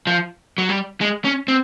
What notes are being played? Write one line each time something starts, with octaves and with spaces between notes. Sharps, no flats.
F3
F#3
G3
G#3
C#4
C4